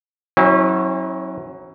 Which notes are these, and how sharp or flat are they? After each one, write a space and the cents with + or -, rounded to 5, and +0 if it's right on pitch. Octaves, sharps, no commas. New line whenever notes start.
F#3 +0 C#4 -45 E4 -30